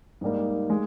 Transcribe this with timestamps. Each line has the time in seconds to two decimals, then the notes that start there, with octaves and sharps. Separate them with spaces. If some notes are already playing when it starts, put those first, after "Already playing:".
0.21 G#2 G3 A#3 D#4
0.70 G#3